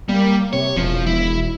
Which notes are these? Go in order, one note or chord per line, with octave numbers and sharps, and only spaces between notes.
G3 A#3
C3 C#5
E1 F3
E4